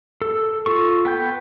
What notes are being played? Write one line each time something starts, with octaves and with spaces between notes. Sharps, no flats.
A4
F4 A4 C#6
B3 G5 G6